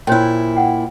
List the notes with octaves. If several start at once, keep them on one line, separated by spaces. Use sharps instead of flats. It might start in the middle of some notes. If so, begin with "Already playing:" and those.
A#2 E4 C5 C#5 G5
D#5 F#5 G5